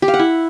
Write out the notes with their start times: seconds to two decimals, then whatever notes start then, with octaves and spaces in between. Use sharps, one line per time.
0.02 G4
0.08 F5
0.14 F#5
0.19 E4